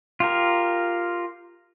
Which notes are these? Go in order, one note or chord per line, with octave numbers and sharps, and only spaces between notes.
F4 G4 A#4